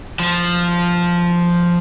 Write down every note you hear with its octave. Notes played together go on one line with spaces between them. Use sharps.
F3